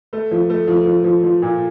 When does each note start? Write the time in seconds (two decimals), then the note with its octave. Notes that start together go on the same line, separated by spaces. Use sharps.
0.13 A3
0.31 F3
0.50 A3
0.67 F3
0.86 F3
1.04 F3
1.23 F3
1.42 A#2